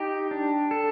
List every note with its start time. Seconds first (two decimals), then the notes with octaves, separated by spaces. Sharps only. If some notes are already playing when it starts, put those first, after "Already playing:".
Already playing: D#4 G4
0.31 D4
0.71 A4